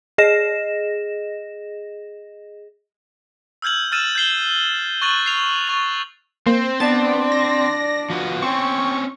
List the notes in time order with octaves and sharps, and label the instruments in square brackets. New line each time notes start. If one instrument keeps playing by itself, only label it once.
[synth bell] G#4 D#5 A#6 E7
[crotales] E6 F6 G6 G#6 F#7
E6 F6 A6 D#7 E7
G6 G#6 C7 G7
C#6 F#6 A6 D#7 F#7
C7 F7
C#6 A6
[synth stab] A#3 [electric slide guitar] C4 [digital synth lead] C5
[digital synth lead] B3 [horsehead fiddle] D4 D5 [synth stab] A5 A6
[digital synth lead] A#6
[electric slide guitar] F3 F#4 B4
[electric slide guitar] C4 C#4 [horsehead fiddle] G5 [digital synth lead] C#6